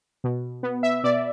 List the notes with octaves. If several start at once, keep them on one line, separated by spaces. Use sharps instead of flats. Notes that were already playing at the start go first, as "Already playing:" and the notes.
B2
B3
E5
B2 D5